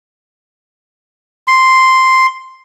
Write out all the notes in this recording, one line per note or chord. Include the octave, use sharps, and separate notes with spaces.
C6